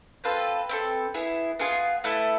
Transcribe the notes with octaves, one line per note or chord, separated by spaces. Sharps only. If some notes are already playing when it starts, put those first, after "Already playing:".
C4 F4 A4 B4
C4 E4 A4
B3 E4 G#4
B3 F4 G#4
A3 E4 A4 B4